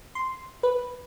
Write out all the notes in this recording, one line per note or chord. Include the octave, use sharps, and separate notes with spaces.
C6
B4